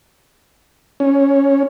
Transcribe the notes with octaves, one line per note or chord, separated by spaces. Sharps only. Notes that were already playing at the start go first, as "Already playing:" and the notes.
C#4